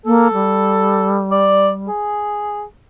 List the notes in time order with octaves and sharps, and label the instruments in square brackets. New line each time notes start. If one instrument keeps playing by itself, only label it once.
[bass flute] A#3 [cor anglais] A4
[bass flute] G3
[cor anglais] D5
G#4